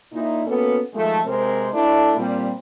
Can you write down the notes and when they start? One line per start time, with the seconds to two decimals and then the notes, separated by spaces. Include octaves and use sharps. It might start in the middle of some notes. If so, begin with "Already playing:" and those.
0.13 A#2 D#4 E4
0.46 A#3 B3 C#4 F#4 A4 B4
0.93 D#3 F3 G#3 A3
1.26 C3 G#3 C4 A#4 C5
1.73 A3 D4 E4
2.17 A#2 G3 C4